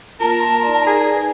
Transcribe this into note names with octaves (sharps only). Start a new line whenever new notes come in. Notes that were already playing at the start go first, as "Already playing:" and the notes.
A#3 F4 A#4 A5
C6
D#4 D5
G#4
B4